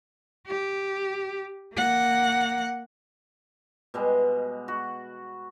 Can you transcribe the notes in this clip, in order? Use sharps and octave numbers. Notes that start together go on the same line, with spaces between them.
G4
A#3 F#5
B2 G3 G#3
F#4